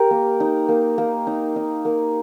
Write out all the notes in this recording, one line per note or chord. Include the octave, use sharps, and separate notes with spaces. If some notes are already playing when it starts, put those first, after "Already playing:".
Already playing: G4 A#4
A#3
D#4
A#3
A#3
D#4
D#4
A#3